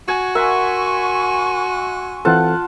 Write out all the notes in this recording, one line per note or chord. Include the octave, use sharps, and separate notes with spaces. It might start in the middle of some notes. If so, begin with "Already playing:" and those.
F#4 G#5
A#4 E5 F#5 G#5 C6 C#6
E3 C4 F4 A4 F#5 A5